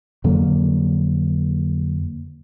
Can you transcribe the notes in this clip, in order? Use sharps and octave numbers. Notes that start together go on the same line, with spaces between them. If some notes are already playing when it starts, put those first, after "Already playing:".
F2 D3 F#3 A#3